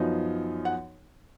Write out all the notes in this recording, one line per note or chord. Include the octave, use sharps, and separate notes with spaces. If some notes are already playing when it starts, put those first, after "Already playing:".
Already playing: F#2 F3 B3 D#4
F#5